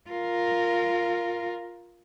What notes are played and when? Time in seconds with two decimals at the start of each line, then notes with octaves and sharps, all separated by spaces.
0.11 F4 A#4